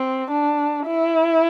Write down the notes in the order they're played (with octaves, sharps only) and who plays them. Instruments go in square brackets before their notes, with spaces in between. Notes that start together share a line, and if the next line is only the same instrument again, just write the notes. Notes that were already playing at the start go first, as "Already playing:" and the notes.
Already playing: [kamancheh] C4
D4
E4